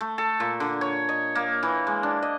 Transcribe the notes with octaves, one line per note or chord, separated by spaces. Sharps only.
A3
A4
A#2
D3
C#5
D#5
A#3
E3
G#3
D4
D#5